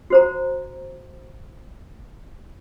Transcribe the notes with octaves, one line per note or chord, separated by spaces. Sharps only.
F#4 C5 A#5